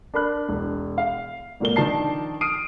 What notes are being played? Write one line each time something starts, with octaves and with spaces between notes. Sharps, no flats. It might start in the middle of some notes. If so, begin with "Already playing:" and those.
D4 A#4 B5 F#6
E1
F5
G#1 A#2 A#4 G7
D#3 F3 D4 A5 C7
D#6 F6 C7 D7 D#7